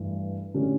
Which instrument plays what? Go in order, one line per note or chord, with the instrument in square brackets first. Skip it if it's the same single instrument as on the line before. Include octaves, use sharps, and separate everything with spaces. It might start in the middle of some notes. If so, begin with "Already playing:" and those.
Already playing: [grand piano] G2 E3 A3
D3 A3 C#4 E4 G4